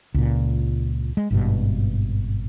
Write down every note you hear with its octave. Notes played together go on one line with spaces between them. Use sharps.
C#2 A#2
G#3
G#1 G2 B2